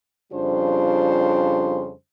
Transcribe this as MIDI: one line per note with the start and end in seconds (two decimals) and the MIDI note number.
0.33 1.91 41
0.33 1.91 49
0.33 1.91 55
0.33 1.91 62
0.33 1.91 65
0.33 1.91 72